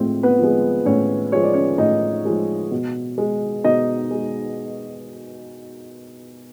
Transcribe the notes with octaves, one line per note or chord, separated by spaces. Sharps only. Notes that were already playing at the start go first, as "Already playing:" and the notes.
Already playing: A2 F3 G#3 C4 C5
B3 B4
F3 G#3
A2 C#4 C#5
F3 G#3 C#5
D5
C#4 C#5
A2 D#4 D#5
F3 G#3
B2
G#3
B2 D#4 D#5
G#3